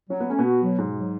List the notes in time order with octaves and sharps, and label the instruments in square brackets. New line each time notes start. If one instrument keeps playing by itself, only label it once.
[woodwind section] F#3 [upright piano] C#4
[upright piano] B3
[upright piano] A3 [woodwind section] C#4
[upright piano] B2 B3
[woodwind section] F#4
F#3
[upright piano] G#2 G#3 [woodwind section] B2
[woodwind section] F#3